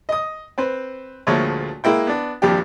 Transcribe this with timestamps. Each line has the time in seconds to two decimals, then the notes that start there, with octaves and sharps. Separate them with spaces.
0.09 D#5 D#6
0.58 C4 B4 C5
1.27 D2 A#2 F3 G#3 A3 C#5
1.84 G#3 A#3 E4 G5
2.07 B3 D4
2.42 G#1 F2 A#2 G3 D4 G4